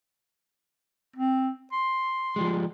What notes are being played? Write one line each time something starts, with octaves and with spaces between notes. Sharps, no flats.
C4
C6
F3 G3 G#3